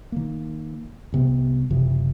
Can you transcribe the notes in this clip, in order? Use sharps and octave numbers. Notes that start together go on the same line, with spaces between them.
D#3 A#3
C2 C3 B3
F#1 C3 E3 F3